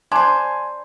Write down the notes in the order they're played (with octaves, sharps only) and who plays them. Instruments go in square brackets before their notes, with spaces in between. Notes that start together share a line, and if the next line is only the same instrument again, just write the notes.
[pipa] D4 C5 [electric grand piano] G#5 B5 [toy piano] C6